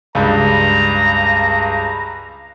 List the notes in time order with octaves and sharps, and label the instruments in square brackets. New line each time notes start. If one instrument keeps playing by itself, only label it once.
[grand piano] C#2 G2 [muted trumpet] A#5